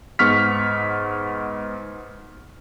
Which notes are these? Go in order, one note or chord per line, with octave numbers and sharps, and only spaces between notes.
G#2 B3 C#6 F6 B6